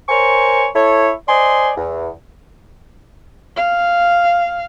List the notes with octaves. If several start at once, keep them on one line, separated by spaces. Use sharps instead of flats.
A#4 C5 C#5 G#5 C#6
E4 A4 C#5
C5 D5 D#5 G#5 C6
E2
F5